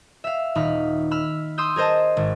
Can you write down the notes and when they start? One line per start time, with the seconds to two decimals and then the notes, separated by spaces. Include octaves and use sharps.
0.24 E5 F5
0.55 D#1 D#4 B5 F6
1.11 B5 E6 F6
1.58 C6 D#6 E6 G6
1.76 G#4 A#4 C5 D#5 A5
2.17 G#1